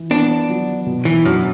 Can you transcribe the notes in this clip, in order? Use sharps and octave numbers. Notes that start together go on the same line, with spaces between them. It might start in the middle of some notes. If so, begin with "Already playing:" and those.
Already playing: E3
B3 D4
F#3
B2
E3
F#2 D4